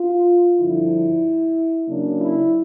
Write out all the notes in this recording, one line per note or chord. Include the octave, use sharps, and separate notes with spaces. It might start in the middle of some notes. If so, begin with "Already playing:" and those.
Already playing: F4
G2 D3 F3 E4
C#3 F#3 A#3 D4
E4